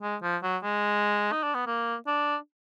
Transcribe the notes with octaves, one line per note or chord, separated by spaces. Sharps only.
G#3
F3
F#3
G#3
D#4
D4
B3
A#3
D4